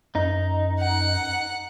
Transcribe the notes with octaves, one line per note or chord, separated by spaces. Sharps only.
F#2 D#4
F#5